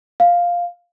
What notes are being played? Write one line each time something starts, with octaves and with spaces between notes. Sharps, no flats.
F5